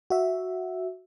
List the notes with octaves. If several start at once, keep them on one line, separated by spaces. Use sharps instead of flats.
F#4 E5